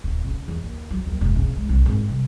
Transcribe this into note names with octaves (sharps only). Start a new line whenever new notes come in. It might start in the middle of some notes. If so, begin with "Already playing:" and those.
D1
C#3
E2
D#2
F#3
D#2
E1
C#3
G#3
C2
G#1
C2